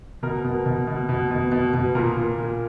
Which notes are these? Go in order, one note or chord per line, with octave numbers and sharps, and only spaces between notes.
B2 A#4
B2
B2
B2
B2
B2
B2
B2
A#2 A#4
A#2
A#2